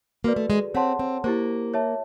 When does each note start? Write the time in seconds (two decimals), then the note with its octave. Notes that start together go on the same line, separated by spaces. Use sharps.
0.24 A#3 F#4 B4 D5
0.36 A3
0.50 G#3
0.74 C4 C#5 F#5 A5 C6
0.99 C4
1.24 A#3 E4 G4 C5
1.74 C#5 E5 A5